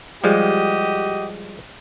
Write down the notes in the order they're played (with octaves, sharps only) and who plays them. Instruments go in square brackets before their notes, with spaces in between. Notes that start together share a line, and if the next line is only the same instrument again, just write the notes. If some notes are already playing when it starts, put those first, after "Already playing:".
[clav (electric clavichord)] F3 G3 G#3 [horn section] F#4 G4 D#5